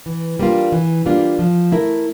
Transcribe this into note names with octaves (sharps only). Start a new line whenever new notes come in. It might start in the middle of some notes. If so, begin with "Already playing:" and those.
E3
G3 A#3 D4 F4
E3
G3 A#3 D4 F4
F3
A3 E4 A#4